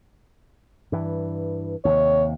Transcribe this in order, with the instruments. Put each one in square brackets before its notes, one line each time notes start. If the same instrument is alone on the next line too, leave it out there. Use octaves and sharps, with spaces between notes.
[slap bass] G2 E3
[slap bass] D#2 C3 [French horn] C#5